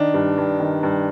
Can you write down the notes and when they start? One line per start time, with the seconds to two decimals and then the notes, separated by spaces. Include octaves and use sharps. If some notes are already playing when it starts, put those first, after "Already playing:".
Already playing: D#3 D4
0.14 G2
0.37 G2
0.60 D#3
0.83 G2